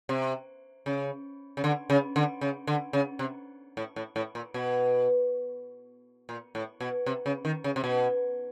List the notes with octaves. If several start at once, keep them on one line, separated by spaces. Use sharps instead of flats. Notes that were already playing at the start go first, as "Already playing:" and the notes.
C3
C#3
C#3
D3
C#3
D3
C#3
D3
C#3
C3
A2
A2
A2
A#2
B2
A#2
A2
B2
C3
C#3
D#3
C#3
C3
B2